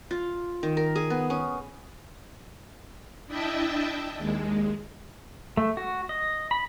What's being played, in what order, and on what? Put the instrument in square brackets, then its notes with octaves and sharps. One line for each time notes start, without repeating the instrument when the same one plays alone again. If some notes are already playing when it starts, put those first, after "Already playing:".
[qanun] F4
D#3
A#4
G#4
B3
C#4
[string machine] D4 E4 D#5 E5 G5 A5
D#2 G#3
[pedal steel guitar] A3
F#4
D#5
B5